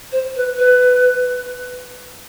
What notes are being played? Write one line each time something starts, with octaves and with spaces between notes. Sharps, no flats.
C5
B4
B4